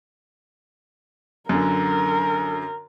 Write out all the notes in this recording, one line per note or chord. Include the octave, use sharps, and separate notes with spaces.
F#2 D3 A#4